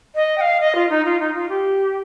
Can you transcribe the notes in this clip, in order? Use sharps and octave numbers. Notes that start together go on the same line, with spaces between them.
D#5
G5
F5
D#5
F4
D#4
F4
D#4
F4
G4